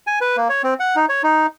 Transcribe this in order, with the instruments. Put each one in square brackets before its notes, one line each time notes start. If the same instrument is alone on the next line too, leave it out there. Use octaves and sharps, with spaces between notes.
[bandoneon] G#5
B4
A#3
C#5
C4
F#5
D#4
C#5
D#4